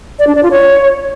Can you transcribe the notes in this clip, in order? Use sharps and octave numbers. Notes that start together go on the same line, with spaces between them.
D5
D4
D5
F4
C#5